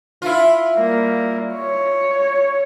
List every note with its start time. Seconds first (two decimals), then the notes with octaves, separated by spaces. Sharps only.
0.22 E4 F4
0.74 G3 A#3
1.54 C#5